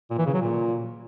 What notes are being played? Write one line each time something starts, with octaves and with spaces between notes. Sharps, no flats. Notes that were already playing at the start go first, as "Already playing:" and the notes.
A#2
E3
C#3
F#3
A#2